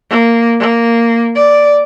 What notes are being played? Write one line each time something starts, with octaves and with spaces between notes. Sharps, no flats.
A#3
A#3
D5